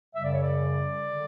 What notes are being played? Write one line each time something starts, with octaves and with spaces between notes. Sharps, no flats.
F#2 C#3 G3 E5
D5
C#5
D5
D3 G3